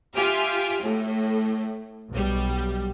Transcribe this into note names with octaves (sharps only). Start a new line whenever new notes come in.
F4 G4 E5 G#5 F6
A2 A3
B1 G3